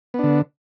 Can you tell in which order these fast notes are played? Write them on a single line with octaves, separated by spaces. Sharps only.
B3 D4 D3